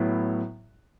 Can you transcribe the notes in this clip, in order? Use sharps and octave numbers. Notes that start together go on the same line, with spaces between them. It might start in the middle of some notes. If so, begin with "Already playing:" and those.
Already playing: A2 F#3 B3 E4